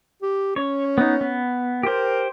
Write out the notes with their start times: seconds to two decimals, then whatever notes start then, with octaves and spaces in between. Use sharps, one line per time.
0.22 G4
0.56 C#4 C#5
0.98 B3 D#4
1.21 B3
1.83 G4 A#4 C5